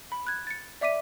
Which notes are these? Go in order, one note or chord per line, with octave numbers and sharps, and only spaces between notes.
B5
F#6 G#6
A6 C#7
D5 E5 D6 B6 D#7